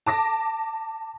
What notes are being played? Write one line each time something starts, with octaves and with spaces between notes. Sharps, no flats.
A5 D6 A#6